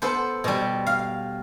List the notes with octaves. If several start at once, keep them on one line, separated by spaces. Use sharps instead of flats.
B3 A4 C5
B2 G3
F5